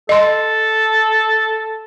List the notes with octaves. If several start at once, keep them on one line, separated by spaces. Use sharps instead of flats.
A4 D#5 C6